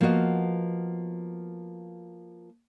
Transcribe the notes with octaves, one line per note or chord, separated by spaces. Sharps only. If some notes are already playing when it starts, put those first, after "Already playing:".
F3 A#3 B3 F#4 D#5